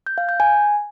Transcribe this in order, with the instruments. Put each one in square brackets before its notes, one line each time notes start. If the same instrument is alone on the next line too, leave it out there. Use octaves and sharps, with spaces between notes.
[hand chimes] G6
F5
G6
G#5